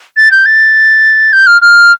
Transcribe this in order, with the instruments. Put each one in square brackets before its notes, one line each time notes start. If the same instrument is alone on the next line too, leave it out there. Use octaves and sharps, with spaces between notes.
[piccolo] A6
G6
A6
G6
F6
F6